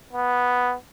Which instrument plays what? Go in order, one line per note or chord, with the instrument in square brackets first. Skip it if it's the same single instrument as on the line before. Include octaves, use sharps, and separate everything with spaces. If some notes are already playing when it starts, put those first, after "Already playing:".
[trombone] B3